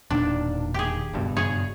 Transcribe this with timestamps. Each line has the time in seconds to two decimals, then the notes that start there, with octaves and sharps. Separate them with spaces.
0.10 E1 A#2 D#3 D4
0.74 G4 G#4
1.13 F#1 G2 B2
1.37 G#4 C#5